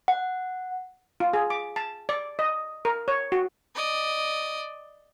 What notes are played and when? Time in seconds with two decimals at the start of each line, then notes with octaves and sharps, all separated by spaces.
0.08 F#5
1.20 F4
1.33 G#4
1.50 D6
1.76 A5
2.09 D5
2.39 D#5
2.85 A#4
3.08 C#5
3.32 F#4
3.75 D5 D#5